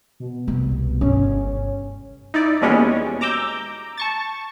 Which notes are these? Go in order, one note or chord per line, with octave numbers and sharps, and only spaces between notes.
B2
C2
G1 C#4
D#4 E4 D5
D#2 B2 E3 G3 G#3 C#4
A#5 D6 E6 G6
A5 C#6 A6